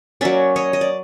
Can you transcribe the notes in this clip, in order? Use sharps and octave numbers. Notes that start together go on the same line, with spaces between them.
F#3 A#3 C#4 D5 E5
C#5 D#5
D#5
D5